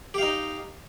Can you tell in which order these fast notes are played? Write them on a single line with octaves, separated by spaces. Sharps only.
G4 F5 D#4